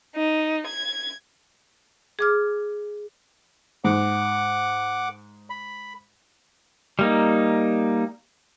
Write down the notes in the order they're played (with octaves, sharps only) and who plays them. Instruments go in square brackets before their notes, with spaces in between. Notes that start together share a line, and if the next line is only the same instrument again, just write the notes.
[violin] D#4
G#6
[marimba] G#4 D6 F6
[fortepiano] G#2 [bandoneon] F#5 D6
[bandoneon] B5
[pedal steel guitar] G3 A#3 D#4